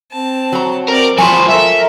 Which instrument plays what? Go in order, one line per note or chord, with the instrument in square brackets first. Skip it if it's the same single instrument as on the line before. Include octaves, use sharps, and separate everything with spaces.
[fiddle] C4 A5
[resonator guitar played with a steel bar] F#3 A#5
[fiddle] C4 D5 [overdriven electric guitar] A#4
[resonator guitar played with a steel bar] F3 F4 G#5 [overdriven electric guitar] F#3 C5 [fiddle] B5 C#6
[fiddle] A4 A#4 [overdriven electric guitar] E5